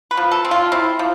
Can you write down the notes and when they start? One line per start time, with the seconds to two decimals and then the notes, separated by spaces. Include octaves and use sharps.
0.11 B4
0.17 F3
0.31 A4
0.45 C4
0.51 F4
0.72 C4 E4
0.99 F3